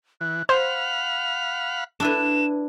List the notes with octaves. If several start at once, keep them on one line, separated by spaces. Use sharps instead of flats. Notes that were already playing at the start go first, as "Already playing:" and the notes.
E3 F#6
C5 F5 F#5 B5 F7
D4 E4 B4 E7